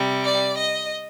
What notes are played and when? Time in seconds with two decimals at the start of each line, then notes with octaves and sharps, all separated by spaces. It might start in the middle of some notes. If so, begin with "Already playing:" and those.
Already playing: C3 G3
0.23 D5
0.58 D#5